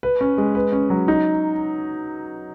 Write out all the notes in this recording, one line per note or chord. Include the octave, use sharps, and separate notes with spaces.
B4
C#4
G#3
B4
C#4
F#3
D#4